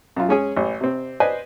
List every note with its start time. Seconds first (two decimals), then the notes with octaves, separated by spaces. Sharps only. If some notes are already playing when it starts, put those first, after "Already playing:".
0.16 F#2 F4
0.29 G#3 C#4 G#4
0.57 A1
0.81 C3 C4
1.20 B4 C5 D5 D#5 G#5